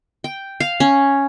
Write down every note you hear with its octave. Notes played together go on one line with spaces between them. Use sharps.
G5
F5
C#4